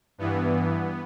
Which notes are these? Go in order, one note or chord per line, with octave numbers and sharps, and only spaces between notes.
G2 E3 B3